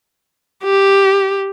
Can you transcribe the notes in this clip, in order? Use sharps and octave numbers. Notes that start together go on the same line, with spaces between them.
G4